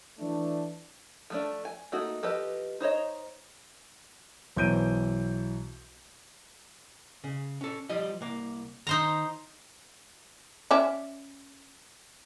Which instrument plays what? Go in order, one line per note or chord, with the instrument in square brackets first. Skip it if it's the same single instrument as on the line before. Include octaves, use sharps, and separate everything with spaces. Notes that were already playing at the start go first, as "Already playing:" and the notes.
[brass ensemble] E3 A3 D4
[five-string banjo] F3 A3 D4
G#5
A3 A#3 D#4 F#4
F3 G4 A4 B4 D#5
D#4 C5 C#5 D#5
[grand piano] B1 E3 C5 G6 D7 D#7
[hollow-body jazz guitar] C#3
C#4 A4
F3 G3 D#5
C2 A#3
[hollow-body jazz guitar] D#3 [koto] D#4 C5 A#5
[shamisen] C#4 D5 E5